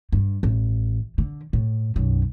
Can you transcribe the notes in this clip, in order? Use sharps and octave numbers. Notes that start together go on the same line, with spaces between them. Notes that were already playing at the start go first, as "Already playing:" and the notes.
G2
A1
D3
A2
B1 F#2